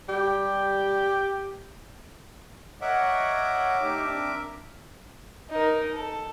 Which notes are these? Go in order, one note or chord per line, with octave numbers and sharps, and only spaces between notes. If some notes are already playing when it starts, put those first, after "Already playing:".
G3 G4
A#4 C#5 D#5 E5 F#5 D6
A3 D#4 G4
C4 D4
D#4 A#4
A4